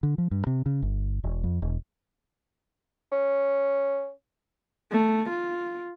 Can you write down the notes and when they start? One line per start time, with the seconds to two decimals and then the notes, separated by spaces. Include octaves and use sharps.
0.03 D3
0.18 F3
0.31 G2
0.47 C3
0.66 C#3
0.82 G1
1.24 E1
1.44 F2
1.62 E1
3.12 C#4
4.92 A3
5.30 F4